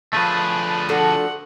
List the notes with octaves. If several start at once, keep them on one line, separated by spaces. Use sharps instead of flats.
D3 F3 A3 G#4 B4
D4 F#4 A4 F#5